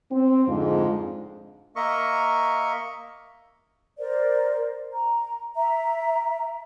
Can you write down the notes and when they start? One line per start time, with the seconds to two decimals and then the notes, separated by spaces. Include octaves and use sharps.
0.11 C4
0.48 F2 G#2 D3 G#3 F4
1.76 A#3 A#4 D#5 E5 C#6
3.98 A#4 C5 D5
4.93 A#5
5.55 E5 A#5